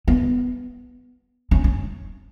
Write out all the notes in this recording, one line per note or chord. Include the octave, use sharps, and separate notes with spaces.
B3
C#4
C#4